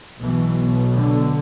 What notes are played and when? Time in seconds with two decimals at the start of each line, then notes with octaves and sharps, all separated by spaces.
0.21 B1 B2 E3
0.94 D3